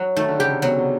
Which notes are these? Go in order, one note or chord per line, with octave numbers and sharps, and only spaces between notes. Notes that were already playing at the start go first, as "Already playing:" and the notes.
Already playing: F#3 E4
D#3 A3
D3
C#3 G4
C3
B2 F#3
C3